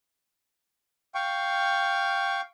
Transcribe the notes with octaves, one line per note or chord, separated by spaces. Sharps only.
F5 G5 C#6